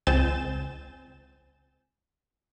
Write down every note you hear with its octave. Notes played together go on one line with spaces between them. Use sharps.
C#2 C4 G#5 G6 A6 E7